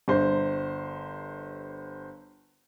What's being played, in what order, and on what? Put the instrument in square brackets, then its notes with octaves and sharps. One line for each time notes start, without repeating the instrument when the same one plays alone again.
[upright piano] G1 C5